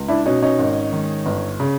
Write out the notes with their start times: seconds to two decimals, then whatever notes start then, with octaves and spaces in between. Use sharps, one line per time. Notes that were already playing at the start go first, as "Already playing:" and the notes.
Already playing: C#2
0.08 D4 E4
0.26 B2 C#4 D#4
0.42 C#4 D#4
0.59 G#1
0.92 G#2 D#3
1.26 G1
1.60 C#3